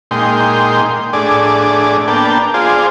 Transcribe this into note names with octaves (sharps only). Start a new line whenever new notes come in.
A#2 G#3 D#4 G5 C6
A2 D4 G#4 D5
A#3 B3 D4 G5 A5
F4 G#4 C5 D5